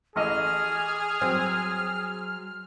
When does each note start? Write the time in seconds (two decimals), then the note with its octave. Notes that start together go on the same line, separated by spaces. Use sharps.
0.16 A1 G#4 D#5 F6
1.21 F#3 C4